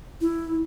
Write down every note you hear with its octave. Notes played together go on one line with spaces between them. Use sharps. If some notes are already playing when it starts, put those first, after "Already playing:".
E4